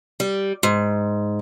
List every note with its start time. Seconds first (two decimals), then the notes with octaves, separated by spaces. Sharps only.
0.20 G3
0.63 G#2